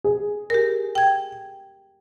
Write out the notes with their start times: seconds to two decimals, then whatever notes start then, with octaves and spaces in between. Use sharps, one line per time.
0.04 G#4
0.50 G4 A#4
0.95 G5 G#6